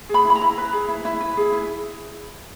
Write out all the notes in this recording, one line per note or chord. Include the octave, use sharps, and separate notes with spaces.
G#4 B5
E4 B5
A#5
E4
B4
G#4
E4
E4
B4
G#4
E4